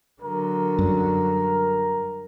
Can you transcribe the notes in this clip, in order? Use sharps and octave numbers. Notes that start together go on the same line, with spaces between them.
D3 F#3 A#4
F#2 G3